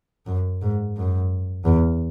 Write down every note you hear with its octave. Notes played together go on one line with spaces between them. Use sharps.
F#2
G#2
F#2
E2